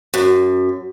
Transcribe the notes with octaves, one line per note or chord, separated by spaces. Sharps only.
F#2